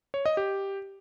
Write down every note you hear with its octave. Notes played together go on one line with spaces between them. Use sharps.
C#5
D#5
G4